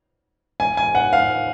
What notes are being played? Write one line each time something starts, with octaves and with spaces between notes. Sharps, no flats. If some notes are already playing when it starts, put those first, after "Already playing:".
G#5
G#5
F#5
F5